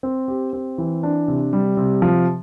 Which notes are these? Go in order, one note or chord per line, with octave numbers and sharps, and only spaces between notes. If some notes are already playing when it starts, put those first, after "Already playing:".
C4
G4
C4
E3
D4
C3
G3
C3
F3